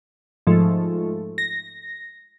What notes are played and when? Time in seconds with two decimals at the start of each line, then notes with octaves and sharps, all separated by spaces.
0.47 G#2 F3 A3
1.38 A#6